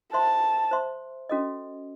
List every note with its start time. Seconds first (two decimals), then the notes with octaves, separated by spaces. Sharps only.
0.13 C5 E5 A5 C6
0.71 C5 E5 C6
1.29 C#4 F#4 A4 D#5